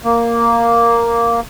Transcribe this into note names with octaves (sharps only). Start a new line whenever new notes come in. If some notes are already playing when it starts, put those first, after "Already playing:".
A#3